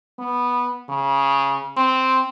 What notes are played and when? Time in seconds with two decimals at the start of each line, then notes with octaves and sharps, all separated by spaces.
0.19 B3
0.89 C#3
1.77 C4